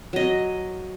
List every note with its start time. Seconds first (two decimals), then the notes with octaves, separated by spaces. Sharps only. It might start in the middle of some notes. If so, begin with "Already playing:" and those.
0.13 F#3 D#5